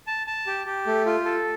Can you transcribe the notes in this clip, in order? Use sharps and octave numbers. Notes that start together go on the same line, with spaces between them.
A5
A5
G4
G4
A3
F4
A4